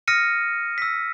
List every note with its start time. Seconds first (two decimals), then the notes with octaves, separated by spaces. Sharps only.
0.08 D#6 F6 A#6 C#7 D#7
0.78 E6 B6